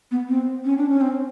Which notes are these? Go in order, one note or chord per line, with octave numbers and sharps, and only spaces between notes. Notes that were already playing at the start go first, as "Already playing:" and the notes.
B3
C4
C#4
D4
C#4
C4